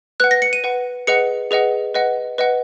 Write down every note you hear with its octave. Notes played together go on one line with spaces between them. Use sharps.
B4 F#5 F#6
A#6
C#7
D#7
B4 F#5
G#4 B4 D#5 F#5 C#7
G#4 B4 D#5 F#5
B4 D#5 F#5
B4 D#5 F#5